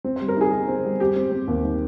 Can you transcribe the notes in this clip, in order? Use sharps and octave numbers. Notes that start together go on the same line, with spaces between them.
C4
C5
G3
A#4
D#4 G#4
D#4
C4
G3
C4 G4
C4
C4
D#2
D#3